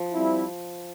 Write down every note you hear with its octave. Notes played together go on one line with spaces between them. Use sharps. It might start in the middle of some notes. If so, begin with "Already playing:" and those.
Already playing: F3
G3 C4 E4